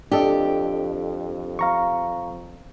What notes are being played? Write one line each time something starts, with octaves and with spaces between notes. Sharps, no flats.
F2 D4 G4 A4 D#5
F5 A#5 C#6